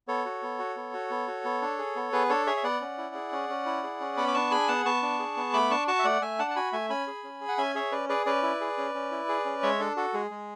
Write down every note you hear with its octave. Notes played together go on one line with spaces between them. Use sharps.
B3 A4 C#5
F#4
B3
F#4
B3
F#4
B3
F#4
B3
D4
G#4
B3
B3 G#4 B4
D4 A4 C#5
G#4 C#5 E5
E5
B3 D5 F#5
C#4
E4
G#4
C#4
C#4
E4
G#4
C#4
B3 B5 D6
D6
D4 A5 C#6
G#4 G#5 B5
B3 F#5 A5
B3 A5 C#6
D4
G#4
B3
A3 B5 D6
D4 A5 C#6
F#4 A5 C#6
E5
A3 D5 F#5
A3 E5 G#5
D4 F#5 A5
A5
F#4 G#5 B5
A3 E5 G#5
C#4 G#5 B5
G#4
C#4
G#4
F#5
C#4 E5 G#5
G#4 C#5 E5
C#4 B4 D5
G#4 B4 D5
C#4 B4 D5
E4
G#4
C#4
C#4
E4
G#4
C#4
G#3 C#5 E5
D4 A4
F#4 A4
G#3 G#4
G#3